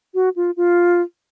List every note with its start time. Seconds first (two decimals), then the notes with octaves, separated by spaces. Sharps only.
0.14 F#4
0.36 F4
0.57 F4